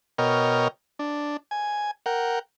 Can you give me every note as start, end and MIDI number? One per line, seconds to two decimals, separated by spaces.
0.18 0.68 47
0.18 0.68 70
0.18 0.68 73
0.18 0.68 75
0.18 0.68 79
0.18 0.68 89
0.99 1.37 62
1.51 1.91 80
2.06 2.39 70
2.06 2.39 78
2.06 2.39 79